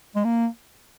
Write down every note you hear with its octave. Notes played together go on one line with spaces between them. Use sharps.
G#3
A#3